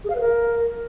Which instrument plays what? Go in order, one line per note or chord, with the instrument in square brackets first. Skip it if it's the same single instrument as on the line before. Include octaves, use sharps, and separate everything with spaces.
[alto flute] G#4
F5
B4
A#4